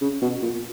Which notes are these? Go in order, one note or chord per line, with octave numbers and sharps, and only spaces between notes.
C#3
B2
A#2